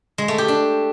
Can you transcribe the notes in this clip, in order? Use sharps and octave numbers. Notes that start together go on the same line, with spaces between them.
G#3
A3
G4
D4